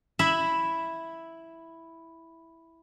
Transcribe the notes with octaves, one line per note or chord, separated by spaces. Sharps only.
E4 E5 B5